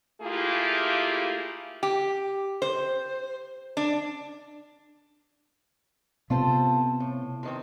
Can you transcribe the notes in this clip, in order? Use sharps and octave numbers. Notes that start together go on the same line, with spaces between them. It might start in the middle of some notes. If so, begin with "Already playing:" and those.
A3 A#3 E4 F4 G4 G#4
G4
C5
D4
C3 B3 F4 A4 C5
A2
C3 D#3 C4